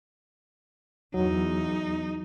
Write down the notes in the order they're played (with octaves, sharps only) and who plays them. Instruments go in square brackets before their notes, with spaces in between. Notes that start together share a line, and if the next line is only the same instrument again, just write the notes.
[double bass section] E2 [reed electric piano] F#3 [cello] D#4